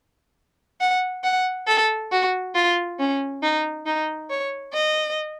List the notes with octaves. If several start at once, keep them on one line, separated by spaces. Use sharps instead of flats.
F#5
F#5
A4
F#4
F4
C#4
D#4
D#4
C#5
D#5